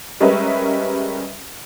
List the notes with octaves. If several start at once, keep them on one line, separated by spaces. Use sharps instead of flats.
G3 G#3 C#4 A#4 B4 E5